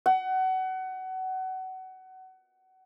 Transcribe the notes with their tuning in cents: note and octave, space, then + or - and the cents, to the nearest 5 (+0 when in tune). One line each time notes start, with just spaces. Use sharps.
F#5 +25